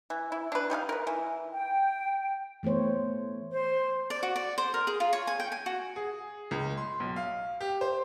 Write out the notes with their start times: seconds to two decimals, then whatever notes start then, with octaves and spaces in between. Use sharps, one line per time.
0.10 E3
0.32 E4
0.52 D4 B4
0.70 G3 D#4 G#4 F5
0.89 A#4 B4
1.07 E3
1.52 G5
2.63 E3 A3 B3 C5 C#5
3.51 C5
4.10 D5
4.23 F#4
4.36 D5
4.58 C5
4.74 A#4
4.87 G#4
5.00 F4
5.13 C#5
5.27 G#5
5.40 G5
5.52 G#5
5.66 F#4
5.96 G#4
6.51 C#2
6.77 C6
7.00 B1
7.16 F5
7.61 G4
7.81 C5